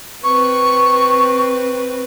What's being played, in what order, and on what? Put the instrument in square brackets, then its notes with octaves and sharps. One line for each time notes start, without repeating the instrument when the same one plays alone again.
[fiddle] C4 B4 [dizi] C#6